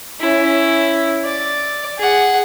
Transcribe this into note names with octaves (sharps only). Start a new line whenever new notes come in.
C#4 E4
D5
G#4 F#5